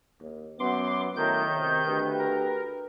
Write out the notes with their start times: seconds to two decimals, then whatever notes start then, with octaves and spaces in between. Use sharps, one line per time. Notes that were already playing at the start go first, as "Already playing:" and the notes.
0.21 D#2
0.60 F#2 B3 C6 D6
1.16 F#2 A2 D#3 A#4 G6
1.54 C3
1.86 D2 G4 B4
2.19 A#4